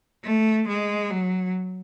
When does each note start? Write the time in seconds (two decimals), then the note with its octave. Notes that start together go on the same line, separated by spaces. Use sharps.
0.24 A3
0.68 G#3
1.10 F#3